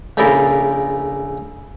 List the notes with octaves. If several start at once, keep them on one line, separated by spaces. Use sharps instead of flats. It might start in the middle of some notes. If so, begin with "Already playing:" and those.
A#1 C#3 E4 G4 A4 A#4